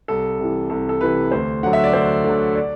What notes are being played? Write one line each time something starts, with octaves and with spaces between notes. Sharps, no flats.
C2 A4
C3 E3
C2 A4
A4
C3 E3 B4
D2 C5
D3 F#3 F#5
E5
D5
D2 C5
D3 F#3
D5